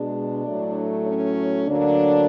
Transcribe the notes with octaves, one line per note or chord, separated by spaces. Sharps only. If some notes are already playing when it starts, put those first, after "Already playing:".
Already playing: B2 G#3 D4
A2 F#3 A3
C#4
D2 D3 F#3 A#3 D4